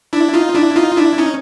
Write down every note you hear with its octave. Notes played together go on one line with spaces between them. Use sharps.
D4 E4
D#4 F4
D4 E4
D#4 F4
D4 E4
C#4 D#4